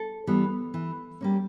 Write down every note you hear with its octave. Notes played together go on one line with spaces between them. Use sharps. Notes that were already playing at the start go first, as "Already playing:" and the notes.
Already playing: A4
E3 G3 B3
E3
G3 A#3 C#4